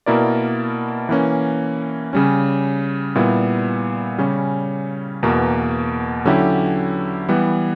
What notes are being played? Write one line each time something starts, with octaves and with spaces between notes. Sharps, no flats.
B2 A#3 E4 A#4 D5
E3 A#3 C#4
C#3 G3 C#4
A#2 G3 B3 E4
C#3 G3 C#4
E2 B2 A#3
D3 F#3 C#4 E4 G4
E3 G3 B3